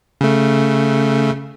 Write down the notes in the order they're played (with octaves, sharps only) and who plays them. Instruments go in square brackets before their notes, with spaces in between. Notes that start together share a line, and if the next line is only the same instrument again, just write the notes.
[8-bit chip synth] C#3 A3